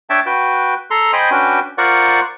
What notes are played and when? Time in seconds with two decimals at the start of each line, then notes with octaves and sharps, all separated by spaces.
0.10 D4 C#5 E5 G5 A5
0.26 F#4 B4 G5
0.91 A4 A#5 C6
1.13 C5 D#5 G5 G#5 B5
1.31 C#4 D4 F#4 B4 G5
1.78 F4 A#4 C5 D5 F#5 C#6